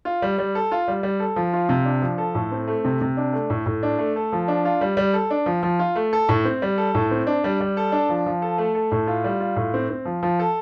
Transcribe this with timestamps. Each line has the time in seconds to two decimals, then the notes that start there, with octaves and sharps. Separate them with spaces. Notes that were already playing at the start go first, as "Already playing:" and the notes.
0.05 F4
0.22 G3
0.38 G3
0.55 A4
0.72 F4
0.88 G3
1.03 G3
1.20 A4
1.36 F3
1.53 F4
1.69 C3
1.85 D4
2.02 F3
2.18 A4
2.35 A2
2.52 C4
2.68 A3
2.85 C3
3.01 C3
3.17 D4
3.33 A3
3.50 A2
3.66 A2
3.83 D4
3.98 A3
4.16 A4
4.32 F3
4.48 D4
4.65 F4
4.81 G3
4.97 G3
5.14 A4
5.30 D4
5.46 F3
5.63 F3
5.79 F4
5.95 A3
6.13 A4
6.29 A2
6.45 C4
6.62 G3
6.78 A4
6.95 A2
7.11 C4
7.27 D4
7.44 G3
7.60 G3
7.77 A4
7.92 D4
8.09 F3
8.26 F3
8.42 A4
8.58 A3
8.75 A4
8.92 A2
9.07 F4
9.24 G3
9.40 F4
9.56 A2
9.74 C4
9.90 C4
10.05 F3
10.23 F3
10.39 A4